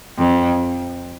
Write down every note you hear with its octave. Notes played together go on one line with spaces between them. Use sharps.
F2